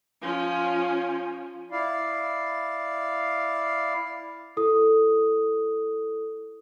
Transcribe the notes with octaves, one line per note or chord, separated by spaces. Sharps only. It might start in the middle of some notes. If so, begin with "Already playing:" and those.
F3 C#4
E4 D5 F5
E4 A4 D#6